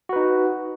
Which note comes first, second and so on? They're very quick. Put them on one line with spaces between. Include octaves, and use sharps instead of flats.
F#4 B4 D#4